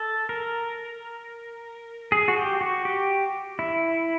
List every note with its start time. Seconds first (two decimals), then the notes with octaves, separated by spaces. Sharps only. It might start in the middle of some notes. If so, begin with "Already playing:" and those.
Already playing: A4
0.29 A#4
2.12 G#4
2.28 F#4
2.37 G4
2.61 F#4
2.85 G4
3.59 E4